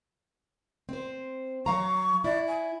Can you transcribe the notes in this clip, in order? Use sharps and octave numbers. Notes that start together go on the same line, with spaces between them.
C4 C5
F#3 F5 A#5 C#6
E4 D5
G#5